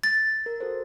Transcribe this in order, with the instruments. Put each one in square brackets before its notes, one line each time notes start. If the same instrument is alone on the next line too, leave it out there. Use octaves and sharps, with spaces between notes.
[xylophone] A6
[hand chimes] A#4
F#4 A4 C5